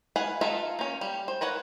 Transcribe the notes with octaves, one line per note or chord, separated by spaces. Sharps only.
E4 B4 F5 F#5 G#5
D#4 F4 A4 E5 F5
A#3 C#4
G3
C5
A#4 B4 C#5 F#5